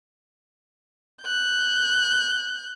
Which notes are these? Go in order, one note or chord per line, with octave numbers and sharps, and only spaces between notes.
F#6 G6